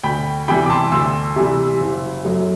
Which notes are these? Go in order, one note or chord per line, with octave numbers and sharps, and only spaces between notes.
D2 G5 B5
C3 E3 G3 G5 B5
D6
A5 C6
D2 C6 E6
C3 E3 G3
F#1
F#2 F#3 A3